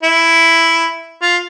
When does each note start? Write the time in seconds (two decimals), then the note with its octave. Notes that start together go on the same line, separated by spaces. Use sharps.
0.03 E4
1.22 F4